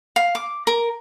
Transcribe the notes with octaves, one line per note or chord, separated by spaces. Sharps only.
F5
D6
A#4